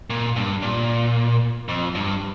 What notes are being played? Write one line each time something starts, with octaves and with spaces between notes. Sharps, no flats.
A#2
G2
A#2
F2
G2